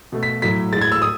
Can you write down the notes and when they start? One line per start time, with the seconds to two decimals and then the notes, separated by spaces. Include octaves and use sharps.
0.12 B2 A3
0.23 B6
0.42 A2 F#3 A3 B6
0.72 A2 G#3 A6
0.81 G#6
0.92 E6
1.02 D#6